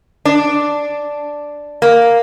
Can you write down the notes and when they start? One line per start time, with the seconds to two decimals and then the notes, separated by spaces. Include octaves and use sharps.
0.25 D4
1.82 A#3